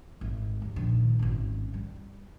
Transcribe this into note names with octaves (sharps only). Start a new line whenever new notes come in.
G#1
D#2
A#1 D#3
G#1 C#4
G3